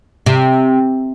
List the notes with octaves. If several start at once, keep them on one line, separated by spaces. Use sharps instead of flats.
C3